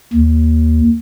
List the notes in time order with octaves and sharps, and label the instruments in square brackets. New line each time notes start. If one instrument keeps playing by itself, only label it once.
[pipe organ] D#2